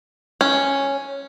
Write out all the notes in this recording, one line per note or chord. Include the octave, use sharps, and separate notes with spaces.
C#4